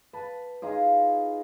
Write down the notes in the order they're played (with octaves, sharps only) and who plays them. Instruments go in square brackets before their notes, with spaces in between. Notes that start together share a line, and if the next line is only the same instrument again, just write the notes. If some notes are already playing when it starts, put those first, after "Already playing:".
[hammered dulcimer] B4 A5
D#4 F4 G#4